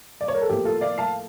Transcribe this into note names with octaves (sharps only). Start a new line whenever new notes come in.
D5
C#5
A#4
A4
A2 F3 A#3 G4
F4 A4
D5 F5
F5 A5